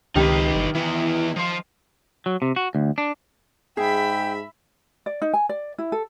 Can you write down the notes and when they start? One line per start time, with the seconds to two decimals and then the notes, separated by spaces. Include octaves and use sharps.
0.15 C#2 C3 D#3 D#4 G4 B4
0.55 G1
0.75 E3 B3 E4
1.36 F3 C5
2.26 F#3
2.42 C3
2.56 F#4
2.75 D2
2.98 D4
3.77 G#2 G#4 E5 G5 B5
5.06 D5
5.22 D#4
5.34 G#5
5.49 D5
5.79 E4
5.92 A4